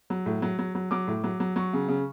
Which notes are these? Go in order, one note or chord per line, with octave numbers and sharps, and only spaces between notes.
F#3
A2
F#3
F#3
F#3
F#3 D6
A2
F#3
F#3
F#3 C#6
C#3
C#3